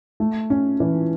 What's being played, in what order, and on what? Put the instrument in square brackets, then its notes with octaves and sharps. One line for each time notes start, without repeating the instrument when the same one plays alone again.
[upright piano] A3
C#4
E3